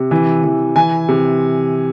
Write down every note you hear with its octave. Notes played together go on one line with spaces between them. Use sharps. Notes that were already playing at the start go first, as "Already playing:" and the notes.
Already playing: C3
E3
E3
E3 G#5
C3